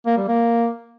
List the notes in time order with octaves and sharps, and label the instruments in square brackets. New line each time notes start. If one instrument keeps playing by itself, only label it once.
[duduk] A#3
G3
A#3